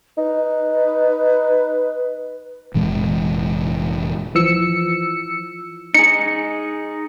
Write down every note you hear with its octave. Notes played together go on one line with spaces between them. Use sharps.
D#4 B4
F1 A#2 E3 G#3
E3 F3 E6 C#7
D#4 G#4 C#7